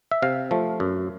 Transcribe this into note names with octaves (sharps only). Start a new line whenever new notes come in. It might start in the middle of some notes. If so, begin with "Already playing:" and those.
E5
C3 F5
F3 A3
F#2